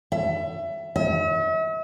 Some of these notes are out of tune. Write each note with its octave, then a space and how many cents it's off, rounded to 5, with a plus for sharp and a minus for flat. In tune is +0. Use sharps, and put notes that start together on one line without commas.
E5 +25
E5 -45